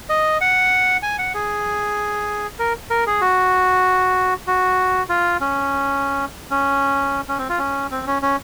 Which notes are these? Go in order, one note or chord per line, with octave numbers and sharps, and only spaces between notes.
D#5
F#5
G#5
F#5
G#4
A#4
A#4
G#4
F#4
F#4
F4
C#4
C#4
C#4
C4
F4
C#4
C4
C#4
C#4